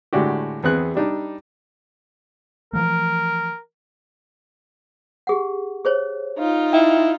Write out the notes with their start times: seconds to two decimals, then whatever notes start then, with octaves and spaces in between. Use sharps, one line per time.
0.13 A2 D3 G#3 D4 F#4 G4
0.63 E2 B3 C4 G#4 F#6
0.95 G3 D4 D#4
2.73 E3 F3 A3 A#4
5.27 G4 G#4 F#5
5.85 G#4 C5 C#5
6.38 D#4 F4
6.73 E4 G5